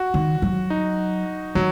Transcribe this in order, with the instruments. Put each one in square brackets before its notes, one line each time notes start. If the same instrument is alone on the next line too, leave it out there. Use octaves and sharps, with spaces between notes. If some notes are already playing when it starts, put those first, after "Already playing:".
Already playing: [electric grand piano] F#4
[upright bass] D#3
F#3
[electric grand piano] D#4
[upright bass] D#3 [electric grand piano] F#3